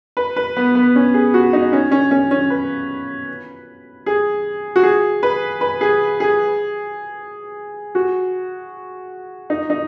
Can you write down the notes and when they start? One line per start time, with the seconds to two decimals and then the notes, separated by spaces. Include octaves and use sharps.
0.17 B4
0.36 B4
0.57 B3
0.75 B3
0.96 C#4
1.14 G#4
1.34 F#4
1.53 D#4
1.73 C#4
1.92 C#4
2.11 C#4
2.31 C#4
2.50 B4
4.06 G#4
4.76 F#4
4.83 G#4
5.23 B4
5.61 B4
5.81 G#4
6.20 G#4
7.95 F#4
9.50 D#4
9.70 D#4